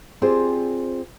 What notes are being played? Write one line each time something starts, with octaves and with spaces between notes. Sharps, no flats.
C4 F4 G4 G#4 C5 D5